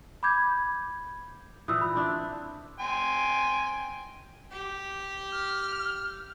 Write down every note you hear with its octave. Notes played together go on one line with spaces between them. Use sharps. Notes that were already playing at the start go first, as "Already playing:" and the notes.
B5 D6 G6 G#6
A#2 E3 D#6 E6
B5
C4 D4 E4
G5 G#5 C6
G4
F6